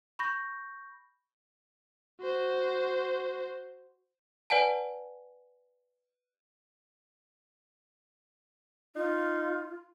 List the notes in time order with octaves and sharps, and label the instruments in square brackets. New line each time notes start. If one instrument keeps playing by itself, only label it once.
[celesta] B5 C#6 G6 A#6
[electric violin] F#4 C5
[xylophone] B4 D5 F#5 G#5 A5
[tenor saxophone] D#4 [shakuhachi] F4